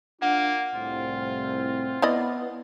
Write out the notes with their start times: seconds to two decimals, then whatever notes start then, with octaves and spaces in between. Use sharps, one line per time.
0.22 A#3 D4 F4 F#5
0.75 C2 A2 C4 F4
2.02 B3 E4 D5 D#5